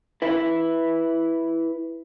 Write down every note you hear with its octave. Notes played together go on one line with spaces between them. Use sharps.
E4 B4